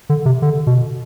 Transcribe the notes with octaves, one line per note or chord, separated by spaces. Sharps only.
D3
C3
D3
B2